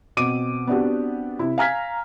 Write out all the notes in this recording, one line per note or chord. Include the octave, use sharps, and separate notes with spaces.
B2 C4 D6 D7 D#7
B3 C4 D4 F#4 G4
C3 E4
F5 G#5 A#5 F6 G#6 B6